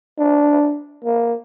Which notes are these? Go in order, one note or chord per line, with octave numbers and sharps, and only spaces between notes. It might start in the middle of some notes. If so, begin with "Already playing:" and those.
D4
A#3